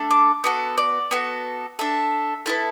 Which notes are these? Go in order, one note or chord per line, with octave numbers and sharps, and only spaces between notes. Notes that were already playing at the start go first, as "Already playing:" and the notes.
Already playing: A3 D4 A4
D6
B3 F#4 A4
D5
B3 F#4 A4
D4 A4 E5
B3 E4 A4 A5